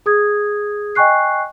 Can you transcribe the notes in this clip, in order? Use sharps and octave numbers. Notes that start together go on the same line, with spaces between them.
G#4 D#6 G#6
D#5 G5 G#5 C#6 F#6 C7